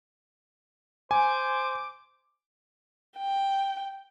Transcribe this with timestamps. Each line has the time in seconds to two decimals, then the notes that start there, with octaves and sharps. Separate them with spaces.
1.11 C5 G#5 D6
3.18 G5